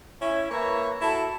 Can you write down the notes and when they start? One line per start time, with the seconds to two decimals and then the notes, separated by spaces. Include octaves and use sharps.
0.21 C#4 E4
0.51 A#3 B4 C#5 E5 A#5
1.02 E4 F#4 A4 A5